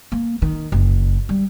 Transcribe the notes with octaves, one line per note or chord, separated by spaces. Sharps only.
A#3
D#3
F#1
G3